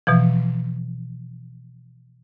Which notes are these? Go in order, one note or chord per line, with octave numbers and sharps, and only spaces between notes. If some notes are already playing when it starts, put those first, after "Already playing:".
B2 E3 F3